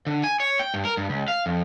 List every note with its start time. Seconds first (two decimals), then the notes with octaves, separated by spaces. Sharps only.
0.07 D3
0.24 G#5
0.40 C#5
0.59 G5
0.74 G2
0.85 A#4
0.97 G2
1.10 C#2
1.28 F5
1.46 F2